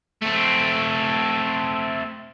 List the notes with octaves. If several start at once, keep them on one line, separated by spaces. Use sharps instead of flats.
A3 C4